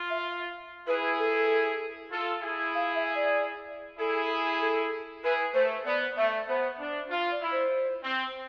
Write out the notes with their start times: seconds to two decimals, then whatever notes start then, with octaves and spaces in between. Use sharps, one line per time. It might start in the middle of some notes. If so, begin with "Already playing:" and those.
Already playing: F4
0.10 E5
0.87 E4 G#4 B4
1.19 A4
2.12 F4 A4
2.43 E4 G#4
2.74 F5
2.95 E5
3.15 D5
3.99 E4 G#4 A4
4.61 A4
5.24 E4 G#4 B4
5.54 A3 C5
5.85 B3 D5
6.17 A3 E5
6.49 B3 C5
6.80 D4
7.10 F4 F5
7.31 D5
7.41 E4
7.51 C5
8.04 C4